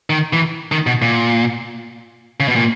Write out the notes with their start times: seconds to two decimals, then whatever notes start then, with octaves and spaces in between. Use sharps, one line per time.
0.10 D#3
0.33 E3
0.72 D#3
0.87 B2
1.02 A#2
2.40 C#3
2.48 B2
2.56 A#2